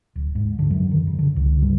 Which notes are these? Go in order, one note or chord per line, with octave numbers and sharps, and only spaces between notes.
D1
G#2
D3
F#2
D#3
C#3
D3
C#2
G2